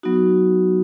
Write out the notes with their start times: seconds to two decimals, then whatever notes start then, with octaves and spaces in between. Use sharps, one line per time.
0.03 F#3 B3 D#4 F#4